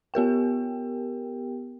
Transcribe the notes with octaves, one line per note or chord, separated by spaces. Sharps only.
B3 G4 A#4 G5